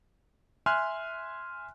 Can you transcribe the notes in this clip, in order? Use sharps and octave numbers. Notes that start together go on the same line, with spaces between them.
E5 G#5 C6 F6 F#6